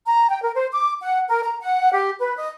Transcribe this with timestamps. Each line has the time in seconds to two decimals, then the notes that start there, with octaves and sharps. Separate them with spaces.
0.05 A#5
0.30 G5
0.42 A#4
0.55 C5
0.71 D6
1.01 F#5
1.28 A#4
1.43 A#5
1.61 F#5
1.93 G4
2.18 B4
2.36 D#5